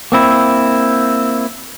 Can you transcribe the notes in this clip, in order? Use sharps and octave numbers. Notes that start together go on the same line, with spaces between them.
A#3 C4 E4